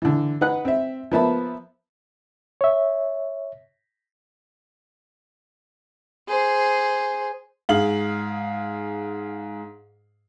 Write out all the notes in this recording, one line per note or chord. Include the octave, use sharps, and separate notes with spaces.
D3 E3
D#4 B4 F#5 F#6
C4 E5
F3 A#3 B3 E5 A5 B5
C#5 E5
G#4 C5
G#2 G#4 F5 F#7